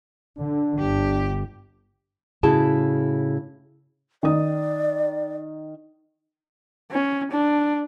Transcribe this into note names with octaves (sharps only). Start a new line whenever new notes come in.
D3 D4
G1 G4
A2 C#3 E4 F#4 G#4 A5
D#3 D5 D#6
C#4
D4